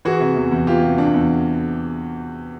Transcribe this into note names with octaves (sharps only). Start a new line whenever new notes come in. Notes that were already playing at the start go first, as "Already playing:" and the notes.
E3 F#4 G#4
C3
E2
E2
E3 F4 G4
C3
E2 D4
E2